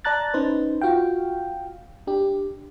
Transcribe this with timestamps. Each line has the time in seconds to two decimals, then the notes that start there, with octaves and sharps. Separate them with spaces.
0.05 D5 A5 A#5 F#6 A6
0.34 C#4 D#4 B4 C5
0.81 F4 F#4 F5 G5
2.07 D4 G4